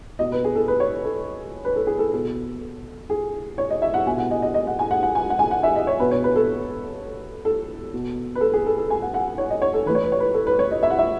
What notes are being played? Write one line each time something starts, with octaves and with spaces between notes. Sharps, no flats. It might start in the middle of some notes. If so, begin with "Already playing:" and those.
B2 D#5
B4
G#4
A4
B4
C#5
A4
B4
A4
G#4
A4
B2 A4
G#4
C#5
D#5
E5
F#5
B2 G#5
F#5
D#5
D#5
D#5
F#5
G#5
F#5
F#5
G#5
F#5
G#5
F#5
E5
D#5
C#5
B2 B4
C#5
B4
A4
A4
B2
B4
A4
G#4
A4
A4
G#5
F#5
F#5
C#5
D#5
C#5
A4
A2 E3 B4
C#5
B4
C#5
B4
A4
B4
C#5
D#5
E5
F#5
E5